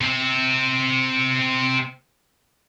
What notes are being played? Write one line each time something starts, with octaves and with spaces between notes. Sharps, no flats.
C3 C4